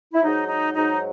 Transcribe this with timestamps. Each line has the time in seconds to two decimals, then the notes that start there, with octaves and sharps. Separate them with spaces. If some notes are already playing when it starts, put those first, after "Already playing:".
0.13 E4
0.23 G#2 F#3 D#4
0.49 D#4
0.75 G#2 F#3 D#4